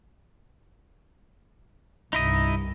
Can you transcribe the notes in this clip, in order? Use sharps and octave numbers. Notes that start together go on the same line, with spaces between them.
C2 G2 D#4 E4 D#5